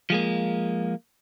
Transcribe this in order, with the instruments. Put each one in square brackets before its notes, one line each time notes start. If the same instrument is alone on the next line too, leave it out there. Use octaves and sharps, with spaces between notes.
[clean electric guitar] F3 G#3 A#3